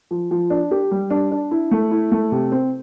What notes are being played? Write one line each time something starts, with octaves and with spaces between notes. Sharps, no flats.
F3
F3
D4
G4
G3
D4
D4
E4
A3
E4
A3
C3
C4